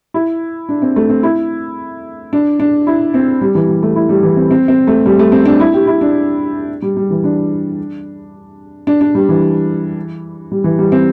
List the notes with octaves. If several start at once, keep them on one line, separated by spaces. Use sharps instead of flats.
E4
D4
C4
A3
C4
E4
D4
D4
E4
C4
G3
E3
G3
A3
E4
G3
E3
C4
C4
C4
A3
G3
A3
C4
D4
E4
G4
E4
D4
G3
G3
E3
D4
D4
D4
G3
E3
G3
E3
G3
C4